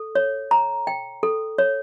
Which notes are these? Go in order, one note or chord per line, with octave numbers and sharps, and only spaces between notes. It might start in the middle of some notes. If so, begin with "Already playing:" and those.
Already playing: A4
C#5
A#5
G5
A4
C#5